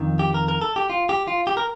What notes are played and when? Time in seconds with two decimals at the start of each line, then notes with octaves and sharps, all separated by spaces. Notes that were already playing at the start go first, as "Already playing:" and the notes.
Already playing: F2 D#3
0.19 G4
0.34 A#4
0.48 A#4
0.61 A4
0.76 G4
0.90 F4
1.09 G4
1.28 F4
1.47 G4
1.57 A#4